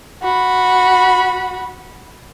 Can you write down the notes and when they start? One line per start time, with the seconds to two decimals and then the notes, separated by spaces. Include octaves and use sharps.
0.22 F#4 B5